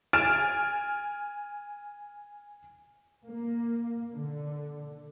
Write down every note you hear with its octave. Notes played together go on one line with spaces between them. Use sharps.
G#5 F6 A6 D7 E7
A#3
D3